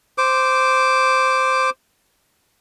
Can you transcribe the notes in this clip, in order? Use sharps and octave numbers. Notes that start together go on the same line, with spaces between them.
C5 D6